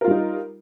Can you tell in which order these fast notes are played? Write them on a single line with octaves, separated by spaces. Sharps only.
A#4 F4 G3 D#4